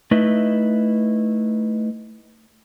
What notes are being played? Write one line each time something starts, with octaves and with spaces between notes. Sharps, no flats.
A3 D#4 E4 B4 D#5